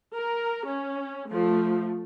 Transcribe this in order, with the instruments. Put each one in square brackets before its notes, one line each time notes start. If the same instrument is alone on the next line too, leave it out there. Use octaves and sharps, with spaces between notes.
[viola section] A#4
C#4
F3 A3